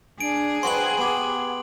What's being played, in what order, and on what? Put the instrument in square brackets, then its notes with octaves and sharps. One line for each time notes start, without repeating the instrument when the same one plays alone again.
[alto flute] D4 [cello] G#4 [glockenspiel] D7
[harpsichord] C4 F#4 B4 [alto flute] F#5 [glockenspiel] C6 F#7
[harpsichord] B3 G4 [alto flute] F#5